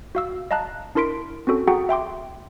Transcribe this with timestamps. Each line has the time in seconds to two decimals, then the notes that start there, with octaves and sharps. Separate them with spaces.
0.15 F#4 F5 E6
0.51 D#5 F5 A5 A#5 F#6
0.95 D4 E4 A#4 C6 B6 D7
1.47 C4 C#4 F#4 A4
1.68 F#4 G#4 F#5 G5 A#5 D#6
1.89 E5 G5 C6 D6